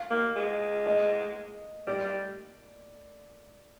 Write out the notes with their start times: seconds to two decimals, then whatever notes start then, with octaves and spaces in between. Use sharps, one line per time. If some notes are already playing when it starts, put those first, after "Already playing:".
Already playing: F5
0.10 A#3
0.36 G#3
0.86 D#5
1.87 G3 D5
2.04 G3